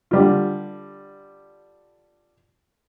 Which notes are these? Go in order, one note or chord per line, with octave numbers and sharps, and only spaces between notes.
D3 G3 F4